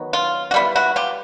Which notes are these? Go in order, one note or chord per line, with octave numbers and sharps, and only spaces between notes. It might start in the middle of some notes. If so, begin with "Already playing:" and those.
Already playing: D#3 F#3 B3
F4
F#4
G3 B3 E4 F4
E4 F#4
F4 G4